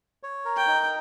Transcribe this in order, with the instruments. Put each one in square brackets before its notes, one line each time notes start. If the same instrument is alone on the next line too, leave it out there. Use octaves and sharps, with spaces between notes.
[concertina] C#5
A#4
[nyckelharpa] G5
[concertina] D#4